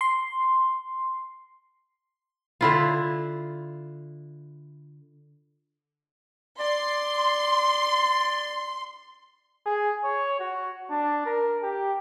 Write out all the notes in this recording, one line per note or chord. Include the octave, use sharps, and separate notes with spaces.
C6
D3 E4 F4
D5 C6
G#4
C#5
F#4
D4
A#4
G4